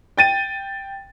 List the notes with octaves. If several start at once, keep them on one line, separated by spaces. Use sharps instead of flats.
G5 A6 D#7